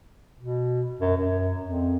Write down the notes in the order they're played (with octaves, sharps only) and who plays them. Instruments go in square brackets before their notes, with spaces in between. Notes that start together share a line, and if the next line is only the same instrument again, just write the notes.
[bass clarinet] B2
F#2
F#2
F2